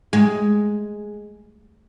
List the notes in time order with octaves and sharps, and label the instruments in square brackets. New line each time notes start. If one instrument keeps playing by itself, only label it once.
[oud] G#3